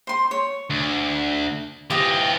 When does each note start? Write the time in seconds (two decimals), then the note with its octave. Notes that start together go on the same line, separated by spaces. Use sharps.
0.07 C5 C6
0.31 C#5
0.70 D2
1.90 E3 F4 G4 D#5